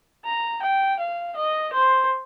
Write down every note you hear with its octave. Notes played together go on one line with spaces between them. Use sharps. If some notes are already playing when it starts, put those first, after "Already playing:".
A#5
G5
F5
D#5
C5